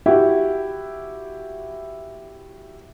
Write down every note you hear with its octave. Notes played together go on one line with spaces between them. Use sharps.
E4 F#4 G4